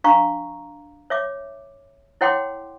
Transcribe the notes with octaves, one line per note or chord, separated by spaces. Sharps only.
D4 F5 A#5 C#6
C#5 E5 D6
E4 C#5 F#5 G5 C6 D6